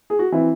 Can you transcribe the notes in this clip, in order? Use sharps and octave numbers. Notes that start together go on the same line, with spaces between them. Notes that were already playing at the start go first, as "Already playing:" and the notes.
G#4
F#4
E3 C4 E4